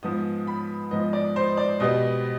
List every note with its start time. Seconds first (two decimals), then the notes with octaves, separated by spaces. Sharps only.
0.03 G#2 F3 B3 D#6
0.47 B5
0.91 G#2 F3 B3 D#5
1.13 D5
1.36 C5
1.57 D5
1.80 B2 G3 B3 D#5